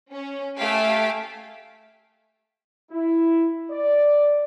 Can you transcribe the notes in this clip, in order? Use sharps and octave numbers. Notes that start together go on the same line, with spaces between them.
C#4
A3 G4 F5 G#5 B6 D7
E4
D5